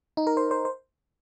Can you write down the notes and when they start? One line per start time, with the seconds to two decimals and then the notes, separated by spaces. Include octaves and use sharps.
0.17 D#4
0.27 A#4
0.37 C5
0.51 C5
0.65 C5